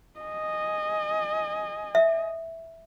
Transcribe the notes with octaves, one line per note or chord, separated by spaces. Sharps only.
D#5 G#5
E5